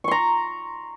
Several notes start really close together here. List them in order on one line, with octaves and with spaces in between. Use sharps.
C#6 C6 A#5